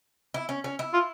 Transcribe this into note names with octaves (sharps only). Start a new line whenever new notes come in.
E4
C#4
C#4
E4
F4